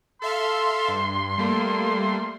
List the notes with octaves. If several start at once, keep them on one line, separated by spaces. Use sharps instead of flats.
A4 E5 F5 C6
G2
G3 A3 A#3